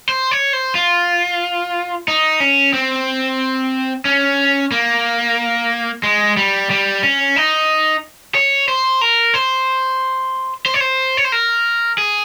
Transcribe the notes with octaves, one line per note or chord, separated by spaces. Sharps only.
C5
C#5
C5
F4
D#4
C#4
C4
C#4
A#3
G#3
G3
G3
C#4
D#4
C#5
C5
A#4
C5
C5
C#5
C5
C#5
C5
A#4
G#4